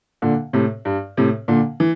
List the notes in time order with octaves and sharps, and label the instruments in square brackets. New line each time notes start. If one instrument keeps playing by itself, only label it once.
[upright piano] A#2 D3
A2 C3
G2
A2 C3
A#2 D3
E3